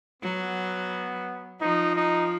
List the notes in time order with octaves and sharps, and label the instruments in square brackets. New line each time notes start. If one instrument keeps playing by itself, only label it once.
[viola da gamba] F#3 [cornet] B3
[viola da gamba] F3 [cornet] D#4
[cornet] D#4